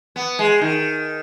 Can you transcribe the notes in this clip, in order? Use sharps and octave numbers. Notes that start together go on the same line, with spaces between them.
B3
G#3
D#3